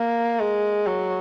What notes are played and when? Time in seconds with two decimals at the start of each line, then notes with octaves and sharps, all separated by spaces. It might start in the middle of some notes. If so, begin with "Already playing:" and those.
Already playing: A#3
0.39 G#3
0.87 F#3